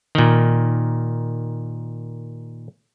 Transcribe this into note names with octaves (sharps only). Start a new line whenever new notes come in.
A#2 D#3